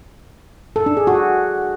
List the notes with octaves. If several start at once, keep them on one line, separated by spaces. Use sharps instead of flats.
A4
D4
G#4
F#4